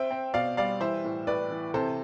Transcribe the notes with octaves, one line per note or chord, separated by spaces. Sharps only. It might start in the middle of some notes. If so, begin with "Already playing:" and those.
Already playing: C4 E5 G5
C4
B2 D5 F5
G3 D5 F5
E3 C5 E5
A2
A2 B4 D5
E3
C3 A4 C5